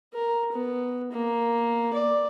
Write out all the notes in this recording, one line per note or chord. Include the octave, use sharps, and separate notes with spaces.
A#4
B3
A#3
D5